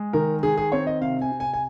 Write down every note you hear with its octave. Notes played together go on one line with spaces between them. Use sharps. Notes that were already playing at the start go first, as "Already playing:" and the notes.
Already playing: G#3
D#3 A#4
D#3 G#4
G#4
C4 C#5
D#5
C3 F5
G#5
C3
G#5
G#5